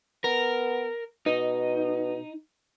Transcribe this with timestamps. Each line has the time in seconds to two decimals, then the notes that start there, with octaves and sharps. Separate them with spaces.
0.24 B3 A#4
1.26 B2 D#4